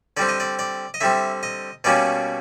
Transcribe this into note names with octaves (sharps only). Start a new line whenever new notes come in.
D3 G3 C4 D5
D#5
D5
D5
D#5
D3 G3 C4 E5
D#5
B2 G3 A#3 C#4 D5